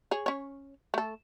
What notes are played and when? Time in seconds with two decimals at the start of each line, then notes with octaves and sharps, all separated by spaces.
0.11 G#4 C#5
0.26 C#4 C#5
0.94 A3 A4